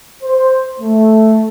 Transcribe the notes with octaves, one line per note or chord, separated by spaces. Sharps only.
C5
A3